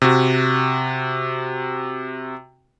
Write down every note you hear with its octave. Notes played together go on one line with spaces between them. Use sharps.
C3 F#4